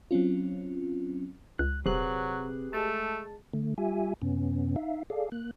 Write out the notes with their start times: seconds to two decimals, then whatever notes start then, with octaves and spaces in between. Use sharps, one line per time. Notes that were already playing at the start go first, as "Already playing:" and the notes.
0.11 F#3 C4 C#4 F4
1.59 C#2 F#6
1.86 D#1 C3 F#3 G4 G#4 B4 F#6
2.73 G#3 A3 A5
3.53 D3 A3
3.78 G3 F4 G4 E5 G#5
4.22 F#2 C3 B3 C#4
4.76 D#4 E5 F5
5.10 G#4 A4 D5 F5
5.32 A#3 F#6